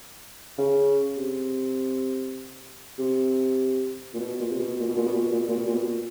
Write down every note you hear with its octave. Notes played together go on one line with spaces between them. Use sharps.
C#3
C3
C3
A#2
B2
A#2
C3
B2
A#2
B2
A#2
B2
A#2
B2
A#2
B2
A#2
B2
A#2
B2
A#2